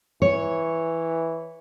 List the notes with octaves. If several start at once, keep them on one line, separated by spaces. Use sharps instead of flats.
E3 C#5